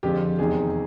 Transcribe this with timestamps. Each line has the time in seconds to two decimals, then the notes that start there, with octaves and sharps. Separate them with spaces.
0.03 F2 D3 F3 G#3 G4
0.38 E2 C3 D#3 G#3 G#4